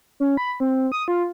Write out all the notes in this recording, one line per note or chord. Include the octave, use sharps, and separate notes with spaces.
C#4
B5
C4
D#6
F4